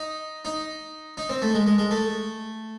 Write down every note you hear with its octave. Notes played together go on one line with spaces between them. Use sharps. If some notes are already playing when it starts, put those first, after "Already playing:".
Already playing: D#4
D#4
D#4
C4
A3
G#3
G#3
G#3
A3